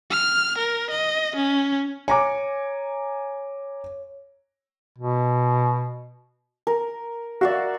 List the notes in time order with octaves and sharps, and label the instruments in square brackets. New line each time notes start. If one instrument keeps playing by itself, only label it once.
[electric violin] F6
A#4
D#5
C#4
[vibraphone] C#5 [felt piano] G#5 A#5 D6
[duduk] B2
[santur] A#4
[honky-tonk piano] F#4 [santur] D5 E5 F5